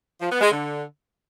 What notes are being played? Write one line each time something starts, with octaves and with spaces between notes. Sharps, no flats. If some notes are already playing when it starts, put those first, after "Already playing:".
F3
B3
G#3
D3